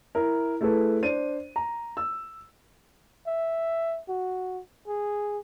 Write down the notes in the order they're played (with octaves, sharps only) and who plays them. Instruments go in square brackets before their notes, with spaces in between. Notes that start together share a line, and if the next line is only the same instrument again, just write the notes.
[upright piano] E4 A#4
A3 E4 G#4 A4 B4
D4 C5 D#7
A#5
E6
[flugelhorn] E5
F#4
G#4